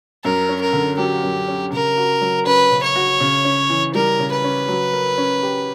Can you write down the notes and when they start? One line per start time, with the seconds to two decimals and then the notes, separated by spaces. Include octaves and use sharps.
0.24 F#2 A#4
0.49 C#4
0.61 A#4
0.73 D3
0.98 F#3 G4
1.23 F#2
1.48 C#4
1.72 C#3 A#4
1.97 F#4
2.21 F#3
2.46 C#4 B4
2.71 C#3
2.83 C#5
2.96 F#4
3.20 C#3
3.45 C#4
3.69 E3
3.95 G3 A#4
4.19 C#3
4.32 B4
4.44 C#4
4.68 F#3
4.93 A#4
5.18 C#4
5.43 G4